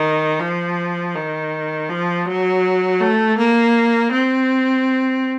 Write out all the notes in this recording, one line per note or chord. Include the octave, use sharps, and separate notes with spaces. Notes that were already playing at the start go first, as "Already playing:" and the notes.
Already playing: D#3
F3
D#3
F3
F#3
A3
A#3
C4